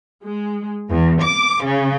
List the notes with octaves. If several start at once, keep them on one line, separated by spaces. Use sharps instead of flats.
G#3
E2
D6
C#3